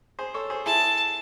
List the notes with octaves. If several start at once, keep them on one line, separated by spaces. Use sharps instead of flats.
G#4 C5
A4 C#5
G#4 C5
E4 G#4 A5